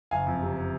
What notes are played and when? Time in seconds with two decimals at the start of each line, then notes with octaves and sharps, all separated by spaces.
0.11 F#1 F5 G#5
0.27 F2
0.42 C3
0.57 C3